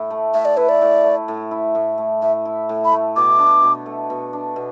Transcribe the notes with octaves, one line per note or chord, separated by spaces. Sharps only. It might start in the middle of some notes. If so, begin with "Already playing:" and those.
Already playing: A2 E4
A3
A2 E5
D5
E4 B4
D5
A2
A3
A2
E4
A2
A3
A2 E5
E4
A2
B5
A3
B2 D6
D4
B2
A3
B2
D4
B2